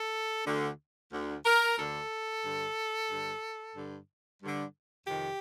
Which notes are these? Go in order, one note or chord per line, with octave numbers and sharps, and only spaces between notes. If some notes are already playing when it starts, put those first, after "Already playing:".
Already playing: A4
D2 D3
D2 D3
A#4
D2 D3 A4
G2 D3
G2 D3
G2 D3
G2 D3
F2 C3 D#3 G4